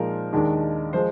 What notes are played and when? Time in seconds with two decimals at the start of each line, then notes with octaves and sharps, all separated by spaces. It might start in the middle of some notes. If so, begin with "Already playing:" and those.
Already playing: A#2 F3 G#3 D#4 A#4
0.33 D#2 D#3 G#3 D4
0.93 F3 G#3 C5